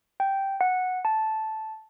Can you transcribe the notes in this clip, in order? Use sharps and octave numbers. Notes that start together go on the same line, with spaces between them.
G5
F#5
A5